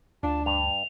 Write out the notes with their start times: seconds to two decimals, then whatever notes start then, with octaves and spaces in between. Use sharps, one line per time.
0.23 D2 D4 F4 A5
0.46 G2 F7